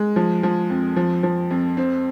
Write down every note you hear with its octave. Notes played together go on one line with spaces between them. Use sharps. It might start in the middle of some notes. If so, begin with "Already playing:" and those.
Already playing: G#3
F3
F3
F2
F3
F3
F2
C4